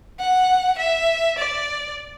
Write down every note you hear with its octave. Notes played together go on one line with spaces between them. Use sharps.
F#5
E5
D5